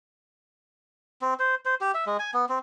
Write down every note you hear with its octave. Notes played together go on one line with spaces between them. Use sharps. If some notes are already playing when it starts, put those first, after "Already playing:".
C4
C5
C5
G4
E5
G#3
G#5
B3
C4